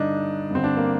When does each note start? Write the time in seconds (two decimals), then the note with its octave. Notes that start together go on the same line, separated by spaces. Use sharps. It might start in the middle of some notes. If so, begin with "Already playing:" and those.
Already playing: G2 D3 D4 D#4
0.51 G2 D3 C4
0.64 D4
0.77 A#3